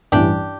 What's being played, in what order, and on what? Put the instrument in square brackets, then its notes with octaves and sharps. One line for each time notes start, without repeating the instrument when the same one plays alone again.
[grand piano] A1 G2 E3 G3 [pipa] D4 G4